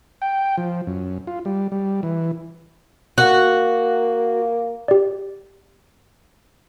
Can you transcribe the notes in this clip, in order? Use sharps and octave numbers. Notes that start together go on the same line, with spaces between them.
G5
F3
F#2
F4
G3
G3
E3
A#3 F#4
G4 D5